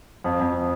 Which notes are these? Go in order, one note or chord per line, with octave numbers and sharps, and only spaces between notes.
F2
F2